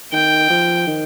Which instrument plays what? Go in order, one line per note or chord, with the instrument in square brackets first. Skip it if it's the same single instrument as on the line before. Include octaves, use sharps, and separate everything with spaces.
[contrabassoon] D#3 [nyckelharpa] G5
[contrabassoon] F3
D#3